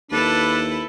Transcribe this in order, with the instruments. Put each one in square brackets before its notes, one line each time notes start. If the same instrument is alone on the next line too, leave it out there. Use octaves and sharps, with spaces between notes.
[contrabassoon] D#2 [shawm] D4 [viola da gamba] E4 A4 B4